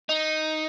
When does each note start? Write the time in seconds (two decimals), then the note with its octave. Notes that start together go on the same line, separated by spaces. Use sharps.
0.09 D#4